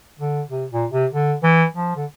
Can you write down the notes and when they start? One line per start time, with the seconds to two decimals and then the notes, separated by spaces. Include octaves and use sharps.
0.20 D3
0.51 C3
0.72 A#2
0.92 C3
1.13 D3
1.43 E3
1.74 F3
1.96 D3